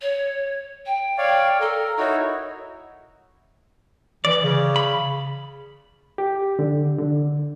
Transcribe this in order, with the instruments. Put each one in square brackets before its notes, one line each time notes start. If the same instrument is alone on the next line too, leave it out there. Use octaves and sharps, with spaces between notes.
[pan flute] C#5
G5
[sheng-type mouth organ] C#5 D5 F5
[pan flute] A4 [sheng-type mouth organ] A#4
[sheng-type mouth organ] D#4 E4 F#4 [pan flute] C#5
[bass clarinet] E3 [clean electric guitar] D5
[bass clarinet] C#3
[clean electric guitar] B5
[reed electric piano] G4
D3
D3